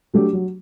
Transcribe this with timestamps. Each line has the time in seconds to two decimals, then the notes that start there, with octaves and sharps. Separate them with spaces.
0.14 F#3 A3 D4 G4
0.33 F#3